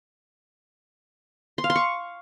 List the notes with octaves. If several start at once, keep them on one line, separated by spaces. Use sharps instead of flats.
C6
F5
C6
C#6